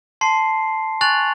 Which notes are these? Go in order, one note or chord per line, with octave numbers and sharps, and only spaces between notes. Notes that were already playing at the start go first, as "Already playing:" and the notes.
A5 C6 C7
G#5 C#6 F#6 A6 F7 F#7